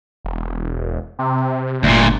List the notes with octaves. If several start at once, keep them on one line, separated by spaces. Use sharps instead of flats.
E1
C3
G1 D2 A#2